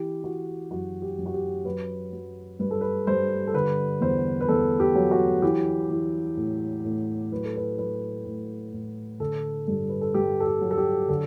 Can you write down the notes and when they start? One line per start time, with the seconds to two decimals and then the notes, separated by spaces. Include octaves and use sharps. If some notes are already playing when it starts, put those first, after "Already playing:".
Already playing: E3 G4
0.24 E3 F#4
0.71 F#2 F#4
1.02 G4
1.18 F#2
1.26 F#4
1.34 G4
1.65 F#3 B4
2.12 F#3
2.59 G2 B4
2.71 A4
2.81 B4
3.07 G2 C5
3.47 A4
3.54 D3 B4
4.01 E2 C5
4.41 B4
4.48 E2 A4
4.80 G4
4.95 F#3
5.11 F#4
5.42 E3 G4
5.90 E3
6.37 A2
6.85 A2
7.32 F#3 B4
7.44 A4
7.57 B4
7.78 F#3 B4
8.26 A2
8.73 A2
9.20 D3 A4
9.67 G2 A4
9.89 B4
10.01 A4
10.14 G2 G4
10.40 A4
10.46 G4
10.61 F#3
10.71 A4
10.78 G4
11.09 D3 A4